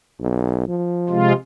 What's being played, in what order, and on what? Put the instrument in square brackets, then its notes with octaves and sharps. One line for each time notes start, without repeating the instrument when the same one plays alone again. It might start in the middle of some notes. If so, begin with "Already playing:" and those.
[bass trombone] B1
F3
[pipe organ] C3 G#3 F4